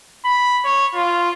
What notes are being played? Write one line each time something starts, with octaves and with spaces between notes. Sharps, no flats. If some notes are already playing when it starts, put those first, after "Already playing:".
B5
C#5
F4